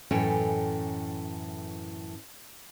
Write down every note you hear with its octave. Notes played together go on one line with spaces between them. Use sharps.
F#2 A2 E3 C#4 A4 G5